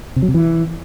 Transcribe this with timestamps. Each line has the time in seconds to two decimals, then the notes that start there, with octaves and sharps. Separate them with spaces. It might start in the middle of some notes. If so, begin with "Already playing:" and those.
0.16 C3
0.22 F#3
0.28 C3
0.34 E3